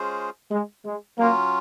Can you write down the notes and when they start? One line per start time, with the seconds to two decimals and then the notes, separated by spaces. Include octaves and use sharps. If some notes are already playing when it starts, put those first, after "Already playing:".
Already playing: G#3 C#4 F4 G#4 C5
0.51 G#3
0.85 G#3
1.18 F#3 A#3 C#4 F4